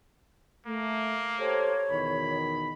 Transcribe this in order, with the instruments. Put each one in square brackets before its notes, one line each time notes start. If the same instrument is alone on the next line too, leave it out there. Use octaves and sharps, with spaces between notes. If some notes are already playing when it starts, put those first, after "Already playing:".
[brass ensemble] A3 [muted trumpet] A#3
[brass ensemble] G4 A4 C5 [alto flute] C#5
[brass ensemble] E2 B2 D#3 [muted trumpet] B5